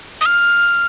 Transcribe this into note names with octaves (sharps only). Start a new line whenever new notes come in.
D#6
F6